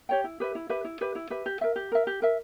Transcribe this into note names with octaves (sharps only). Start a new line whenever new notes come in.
G4 C#5 G5
E4
G4 B4 E5
E4
G4 B4 E5
E4
G4 B4 E5
E4
G4 B4 E5
G4
A#4 E5
G4
A#4 E5
G4
A#4 E5